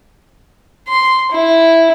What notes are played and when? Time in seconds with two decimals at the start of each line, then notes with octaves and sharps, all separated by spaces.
0.88 C6
1.31 E4